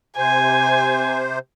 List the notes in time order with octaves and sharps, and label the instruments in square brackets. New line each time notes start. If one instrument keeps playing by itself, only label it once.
[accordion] C3 C5 [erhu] G#5